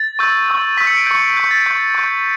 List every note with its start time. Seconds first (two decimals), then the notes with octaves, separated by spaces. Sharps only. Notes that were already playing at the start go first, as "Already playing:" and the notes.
Already playing: A6
0.19 C#6 E6 G6
0.48 C#6 E6 G6
0.77 C#6 E6 G6 B6
0.87 C#7
0.97 D7
1.07 C#6 G6
1.36 C#6 G6 C#7
1.51 A6
1.66 C#6 G6
1.95 C#6 G6